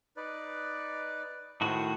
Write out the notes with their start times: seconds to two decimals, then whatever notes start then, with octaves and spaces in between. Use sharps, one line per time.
0.17 D#4 B4 D5
1.61 A2 D#3 F#4 C5 D#6